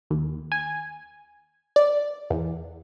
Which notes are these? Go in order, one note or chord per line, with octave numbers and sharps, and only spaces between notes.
D#2
G#5
D5
E2